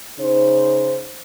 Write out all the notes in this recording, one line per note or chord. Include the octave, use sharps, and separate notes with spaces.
C#3 D#4 C5